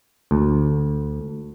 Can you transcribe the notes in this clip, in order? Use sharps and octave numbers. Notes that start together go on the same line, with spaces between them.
D2